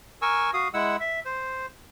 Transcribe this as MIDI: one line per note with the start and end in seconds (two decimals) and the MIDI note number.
0.22 0.51 70
0.22 0.51 80
0.22 0.51 85
0.22 0.51 88
0.54 0.68 66
0.54 0.68 77
0.54 0.68 87
0.74 0.96 56
0.74 0.96 64
0.74 0.96 78
0.74 0.96 88
1.00 1.20 76
1.25 1.66 72